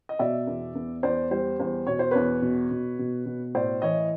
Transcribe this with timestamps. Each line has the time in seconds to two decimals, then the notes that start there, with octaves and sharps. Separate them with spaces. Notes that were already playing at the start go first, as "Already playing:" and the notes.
0.09 D#5
0.19 B2 D5 E5
0.47 E2
0.75 E2
1.03 E2 C5 D5
1.31 G3 C5
1.60 E2 C5
1.87 B2 C#5
1.99 C5
2.11 E2 B4 C#5
2.42 B2
2.71 B2
2.99 B2
3.26 B2
3.55 A2 C5 D5
3.82 E3 C#5 D#5